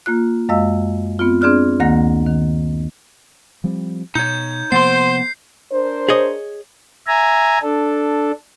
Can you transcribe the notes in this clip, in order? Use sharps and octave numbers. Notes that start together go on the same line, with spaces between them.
A#3 F4 F#6
F#2 G#3 D#5 F5 E6
B3 C4 F4
C4 D4 G#4 D5 F6 F#6
D2 D#3 A#3 F#5 A#6
D#3
F3 G3 C4
B2 D#4 C#5 G6
C3 F3 A#3 B3 C5 C6 C7
D4 A#4 C5
G#4 C#5 D#5
E5 G#5 A#5
D4 A4